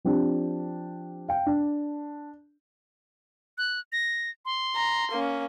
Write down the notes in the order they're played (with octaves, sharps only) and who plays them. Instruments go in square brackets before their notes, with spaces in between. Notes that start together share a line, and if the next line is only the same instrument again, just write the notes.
[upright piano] F3 C4 D4 G4
F5 G5
D4
[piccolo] F#6
A#6
C6
[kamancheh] A#5
A#3 C#4